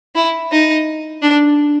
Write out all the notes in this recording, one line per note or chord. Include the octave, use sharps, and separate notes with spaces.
E4
D#4
D4